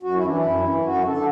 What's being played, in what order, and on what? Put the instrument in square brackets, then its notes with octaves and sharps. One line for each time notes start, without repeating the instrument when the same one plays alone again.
[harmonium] F#2 F#4
E4
E3 D4
E4
F#2
E3
F#2 F#4
D3 A4